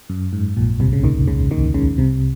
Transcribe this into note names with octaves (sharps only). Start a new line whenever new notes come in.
F#2
G#2
A#1 A#2
C2 C3
C#3
D#2 D#3
C#2 C#3
D#2 D#3
C#2 C#3
C2 C3